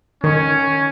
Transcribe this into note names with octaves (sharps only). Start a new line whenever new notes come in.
D#3 C#4